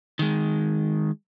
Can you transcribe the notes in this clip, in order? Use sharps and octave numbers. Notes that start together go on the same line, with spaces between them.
D#3 G#3